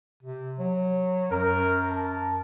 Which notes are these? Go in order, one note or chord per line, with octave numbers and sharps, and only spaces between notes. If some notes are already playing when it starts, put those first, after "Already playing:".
C3
F#3
F#2 A#4
A#4 A5